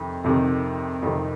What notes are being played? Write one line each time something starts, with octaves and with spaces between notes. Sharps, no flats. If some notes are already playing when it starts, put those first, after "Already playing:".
Already playing: F2 C3 D#3
F2 C3 D#3
F2 C3 D#3